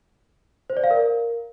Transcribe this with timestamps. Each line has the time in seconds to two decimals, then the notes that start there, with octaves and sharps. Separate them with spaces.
0.70 C5
0.77 D5
0.84 F5
0.91 A#4